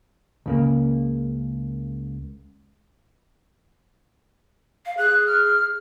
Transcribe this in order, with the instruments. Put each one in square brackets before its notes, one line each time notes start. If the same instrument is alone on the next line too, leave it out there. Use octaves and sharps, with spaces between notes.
[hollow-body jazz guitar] C#2 C#3 A#3
[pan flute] F5
[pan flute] G#4 [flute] F#6
[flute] F6